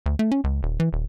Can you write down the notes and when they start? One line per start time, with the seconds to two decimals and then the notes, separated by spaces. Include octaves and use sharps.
0.06 D2
0.19 A3
0.32 C#4
0.44 C#2
0.63 D#1
0.80 E3
0.93 D#1